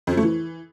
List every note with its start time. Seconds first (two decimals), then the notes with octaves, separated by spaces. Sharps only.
0.07 F2
0.12 F3
0.17 A3
0.22 E3